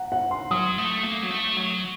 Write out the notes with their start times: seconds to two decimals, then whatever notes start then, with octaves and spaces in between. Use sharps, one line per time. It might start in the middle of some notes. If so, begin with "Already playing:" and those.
Already playing: F#5 A#5
0.12 F#5
0.31 C6
0.51 F#3 D#6
0.78 A3
1.03 A#3
1.22 F#3
1.31 A3
1.56 F#3